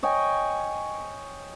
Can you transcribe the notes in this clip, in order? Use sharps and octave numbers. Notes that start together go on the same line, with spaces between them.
C#5 D#5 G5 G#5